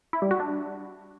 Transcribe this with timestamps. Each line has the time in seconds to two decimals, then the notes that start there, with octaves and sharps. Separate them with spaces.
0.13 E4
0.22 G3
0.31 F#4
0.40 D4